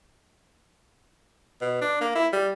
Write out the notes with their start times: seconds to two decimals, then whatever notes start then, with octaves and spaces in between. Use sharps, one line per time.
1.61 B2
1.82 D4
2.01 A#3
2.15 E4
2.33 G3